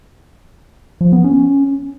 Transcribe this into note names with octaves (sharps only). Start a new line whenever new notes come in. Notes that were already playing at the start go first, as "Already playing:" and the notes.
F3
B3
C#4